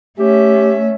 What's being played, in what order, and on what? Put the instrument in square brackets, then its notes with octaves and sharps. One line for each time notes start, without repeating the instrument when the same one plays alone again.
[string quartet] A3 C#4 E5 [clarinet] G4